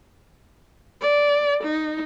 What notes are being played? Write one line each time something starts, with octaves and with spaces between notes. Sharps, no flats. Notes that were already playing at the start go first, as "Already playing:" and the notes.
D5
D#4